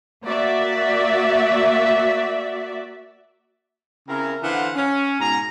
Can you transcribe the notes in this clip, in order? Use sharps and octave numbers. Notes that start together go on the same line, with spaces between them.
A#3 F#4 D5 E5
C#3 C4 E4 A#4
D3 E3 E4 C5 F5 F#5
C#4
G#2 B2 G#5 A#5